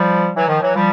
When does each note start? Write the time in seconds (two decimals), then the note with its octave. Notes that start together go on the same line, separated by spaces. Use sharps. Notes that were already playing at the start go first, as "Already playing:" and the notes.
Already playing: F3 G3
0.36 E3 F#3
0.48 D#3 F3
0.62 E3 F#3
0.75 F3 G3